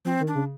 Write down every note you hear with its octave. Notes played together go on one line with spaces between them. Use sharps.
F3 C4
D#3
D4
C#3